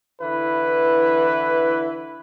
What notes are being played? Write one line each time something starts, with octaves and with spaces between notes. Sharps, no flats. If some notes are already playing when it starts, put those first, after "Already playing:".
D3 E3 E4 B4